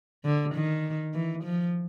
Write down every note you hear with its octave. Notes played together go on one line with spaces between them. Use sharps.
D3
D#3
E3
F3